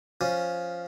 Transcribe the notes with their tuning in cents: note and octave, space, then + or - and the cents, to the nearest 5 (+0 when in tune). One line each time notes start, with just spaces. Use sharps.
F3 +0 C#4 +0